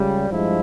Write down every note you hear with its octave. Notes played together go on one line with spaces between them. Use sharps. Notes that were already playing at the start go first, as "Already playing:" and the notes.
Already playing: C#2 C#3 G3
G2 F3 G#3 E4